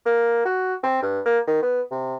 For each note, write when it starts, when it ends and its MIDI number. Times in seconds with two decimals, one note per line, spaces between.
0.06 0.45 58
0.45 0.74 66
0.83 0.98 60
1.02 1.20 43
1.26 1.39 58
1.47 1.62 51
1.62 1.81 59
1.91 2.16 48